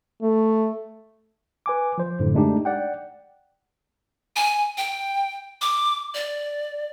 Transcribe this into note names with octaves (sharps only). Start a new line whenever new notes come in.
A3
B4 G#5 D6
F3 C5
F#2 A2 D3
G#3 A3 D4 D#4 G4
D5 F#5 G5
G#5
G5
D6
D5